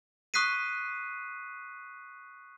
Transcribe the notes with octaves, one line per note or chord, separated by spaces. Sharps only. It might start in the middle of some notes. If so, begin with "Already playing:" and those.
C#6 D#6 F#6 B6 C7 D#7